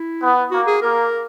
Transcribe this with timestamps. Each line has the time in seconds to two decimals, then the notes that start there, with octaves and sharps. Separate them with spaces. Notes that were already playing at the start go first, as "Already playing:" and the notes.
Already playing: E4
0.21 B3
0.51 A#3 F#4
0.67 G#4
0.81 A#3 A#4